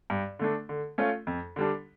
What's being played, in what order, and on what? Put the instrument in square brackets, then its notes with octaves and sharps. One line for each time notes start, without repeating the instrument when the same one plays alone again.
[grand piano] G2
D3 A3 D4
D3
A3 C#4 F4
F2
D3 G3 D4